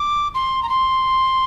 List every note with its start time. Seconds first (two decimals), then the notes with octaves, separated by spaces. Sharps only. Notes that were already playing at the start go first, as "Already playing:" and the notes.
Already playing: D6
0.34 C6
0.63 A#5
0.69 C6